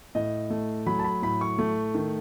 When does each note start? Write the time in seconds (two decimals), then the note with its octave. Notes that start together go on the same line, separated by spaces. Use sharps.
0.15 A2 D#5
0.50 A3
0.86 F#3 B5
0.99 A5
1.04 B5
1.22 A2 B5
1.41 C#6
1.58 A3
1.95 D#3